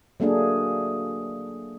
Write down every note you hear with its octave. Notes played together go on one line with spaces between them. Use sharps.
F#3 A3 A#3 D4 G#4